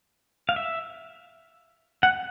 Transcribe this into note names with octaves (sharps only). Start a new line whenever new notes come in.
F5
E5
F#5